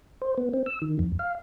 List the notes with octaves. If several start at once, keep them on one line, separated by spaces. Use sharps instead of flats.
C5
B3
C4
E6
D#3
F2
F5